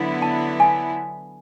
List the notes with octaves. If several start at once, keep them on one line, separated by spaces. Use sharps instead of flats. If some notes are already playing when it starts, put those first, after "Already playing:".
Already playing: D3 F#3 B3 E4
A5
G#5